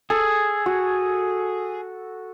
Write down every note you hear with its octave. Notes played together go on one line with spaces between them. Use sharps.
G#4 A4
F#4